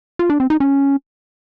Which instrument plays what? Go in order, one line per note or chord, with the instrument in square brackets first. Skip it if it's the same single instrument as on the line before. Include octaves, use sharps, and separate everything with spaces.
[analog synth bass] F4
D4
C4
D#4
C#4